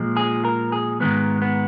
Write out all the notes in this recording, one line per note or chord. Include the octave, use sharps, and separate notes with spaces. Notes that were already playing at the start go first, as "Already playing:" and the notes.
Already playing: A#2 F3 G#3
G#4
A#4
G#4
G#2 D#3 G#3 B3
B3